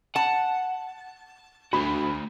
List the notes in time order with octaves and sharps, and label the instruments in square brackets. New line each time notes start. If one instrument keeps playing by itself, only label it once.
[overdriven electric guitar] F#5 [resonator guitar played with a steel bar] A5
[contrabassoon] D2 [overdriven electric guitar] A3 F#4 [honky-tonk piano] B5